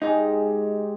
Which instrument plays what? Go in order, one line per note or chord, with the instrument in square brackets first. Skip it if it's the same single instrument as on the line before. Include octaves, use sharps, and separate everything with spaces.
[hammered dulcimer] G#2 G#3 G4 [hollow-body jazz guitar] D#4